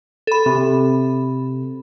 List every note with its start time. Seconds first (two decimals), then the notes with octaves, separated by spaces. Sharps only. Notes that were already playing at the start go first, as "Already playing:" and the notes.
0.27 A4 B5
0.46 C3